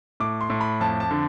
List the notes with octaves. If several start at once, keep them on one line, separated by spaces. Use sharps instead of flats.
A2 D6
C6
A2
B5
F2 A5
A5
D3